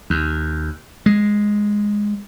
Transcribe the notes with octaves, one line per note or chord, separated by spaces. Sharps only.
D#2
G#3